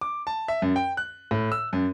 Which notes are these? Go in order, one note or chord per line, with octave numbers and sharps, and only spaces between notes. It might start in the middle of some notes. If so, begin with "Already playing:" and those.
D6
A5
E5
F#2
G5
F#6
A2
E6
F#2